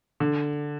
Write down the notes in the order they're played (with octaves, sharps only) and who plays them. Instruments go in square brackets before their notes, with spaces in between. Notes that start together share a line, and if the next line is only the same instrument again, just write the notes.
[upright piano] D3